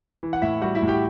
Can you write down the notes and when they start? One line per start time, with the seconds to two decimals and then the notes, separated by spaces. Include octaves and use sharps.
0.23 E3
0.33 F#5
0.42 A2 E4 E5
0.61 G3 F#4 F#5
0.75 E4 E5
0.82 A2
0.88 G4 G5